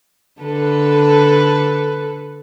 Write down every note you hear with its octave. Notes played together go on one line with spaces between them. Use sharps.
D3 A4 B4